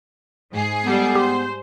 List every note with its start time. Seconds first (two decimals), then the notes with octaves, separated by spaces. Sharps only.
0.52 G#2 G#4 C7
0.84 G3 B3 A4
1.15 G4 C5